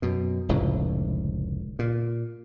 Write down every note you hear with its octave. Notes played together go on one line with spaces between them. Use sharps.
F#2 B2
F1 C#2 A2 D3
A#2